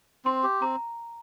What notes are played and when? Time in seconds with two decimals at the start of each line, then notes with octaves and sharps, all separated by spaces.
0.25 C4 C6
0.43 G4
0.61 C4 A#5